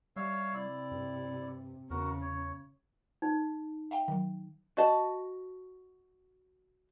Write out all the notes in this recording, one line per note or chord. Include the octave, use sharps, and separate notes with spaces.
G3 C#5 E5 F5
C3 E4 D5
G2
E2 C#3 F#4 A#4
C#5
D#4
E5 F5 G5
D#3 F#3
F#4 D#5 A5